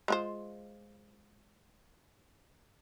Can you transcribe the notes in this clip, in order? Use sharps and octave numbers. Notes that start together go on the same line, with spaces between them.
G#3 F4 C5